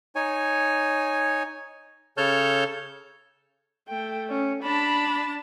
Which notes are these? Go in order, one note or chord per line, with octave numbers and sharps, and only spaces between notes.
D#4 C#5 G#5
C#3 A4 C#5 A5 F6 G6
A3 G5
C#4
D4 A5 B5